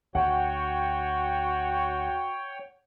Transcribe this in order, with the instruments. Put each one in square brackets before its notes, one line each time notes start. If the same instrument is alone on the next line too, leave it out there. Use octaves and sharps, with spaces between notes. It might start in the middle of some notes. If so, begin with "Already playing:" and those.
[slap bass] D2 [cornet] F#4 [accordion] C#5 G5 [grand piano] F#5